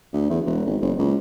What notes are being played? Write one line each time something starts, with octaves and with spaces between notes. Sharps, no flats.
D2
E2
E1
G#1
F#1
C#2